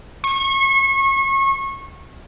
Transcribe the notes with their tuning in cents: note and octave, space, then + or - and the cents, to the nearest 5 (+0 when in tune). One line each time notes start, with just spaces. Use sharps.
C#6 -30